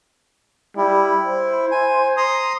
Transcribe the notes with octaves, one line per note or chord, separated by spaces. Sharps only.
G3 E4
C5
G#5
A#5 C6 D#6